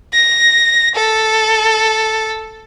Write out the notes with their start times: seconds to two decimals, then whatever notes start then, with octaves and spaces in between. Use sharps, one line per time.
0.14 A#6
0.95 A4